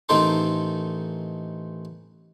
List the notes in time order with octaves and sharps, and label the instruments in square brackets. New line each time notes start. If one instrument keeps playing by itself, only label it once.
[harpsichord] A1 D#3 C4 D#4 A4 C6